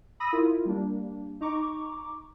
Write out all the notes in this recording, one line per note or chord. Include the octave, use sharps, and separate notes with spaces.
B5 D#6 E6 A#6 D#7
E4 F4 A#4
G3 A#3 D4
D#4 A#5 C#6 D6